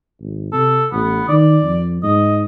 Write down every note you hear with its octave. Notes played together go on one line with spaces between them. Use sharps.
G#1
C3 A4
A1 B3
D#3 D5
F2
G#2 D#5